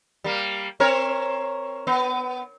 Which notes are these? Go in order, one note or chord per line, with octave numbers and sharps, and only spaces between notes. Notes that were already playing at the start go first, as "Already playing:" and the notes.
G3 A#3
C4 A#4 C#5
B3